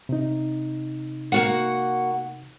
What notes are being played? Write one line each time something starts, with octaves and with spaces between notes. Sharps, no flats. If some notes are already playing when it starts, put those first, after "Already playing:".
C3 D#4
A#3 F#4 F#5